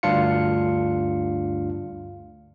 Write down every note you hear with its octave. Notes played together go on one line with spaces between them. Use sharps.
D2 G2 D4 F4 F5 C#7